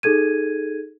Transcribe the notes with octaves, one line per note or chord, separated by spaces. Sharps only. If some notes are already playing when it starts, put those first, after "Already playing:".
D#4 G#4 A4 G#6 D#7